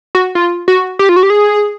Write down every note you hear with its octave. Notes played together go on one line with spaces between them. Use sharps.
F#4
F4
F#4
G4
F4
F#4
G4
G#4